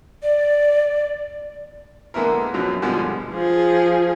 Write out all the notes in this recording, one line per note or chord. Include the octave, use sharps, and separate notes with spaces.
D5
D3 G#3 A#3 B3 E4 A#4
F#2 B2 F3 F#3
G2 B2 D3 F3 G3 G#3
F3 G#4